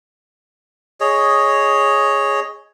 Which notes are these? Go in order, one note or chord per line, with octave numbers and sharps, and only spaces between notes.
G#4 C#5 D#5